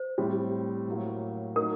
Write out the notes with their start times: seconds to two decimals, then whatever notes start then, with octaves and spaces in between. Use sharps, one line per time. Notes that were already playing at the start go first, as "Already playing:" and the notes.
Already playing: C5
0.18 A2 G3 C4
0.88 A2 F#3 A#3
1.56 F#3 A3 D#4 A#4